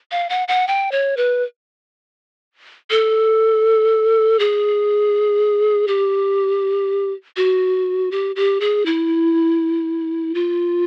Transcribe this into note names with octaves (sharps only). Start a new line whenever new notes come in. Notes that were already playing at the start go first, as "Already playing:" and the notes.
F5
F#5
F#5
G5
C#5
B4
A4
G#4
G4
F#4
G4
G4
G#4
E4
F4